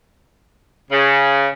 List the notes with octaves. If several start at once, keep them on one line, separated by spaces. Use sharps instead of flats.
C#3